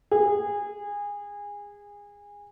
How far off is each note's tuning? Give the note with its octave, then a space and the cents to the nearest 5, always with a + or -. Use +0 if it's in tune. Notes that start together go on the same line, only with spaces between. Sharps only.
G#4 -25